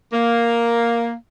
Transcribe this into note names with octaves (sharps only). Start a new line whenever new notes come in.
A#3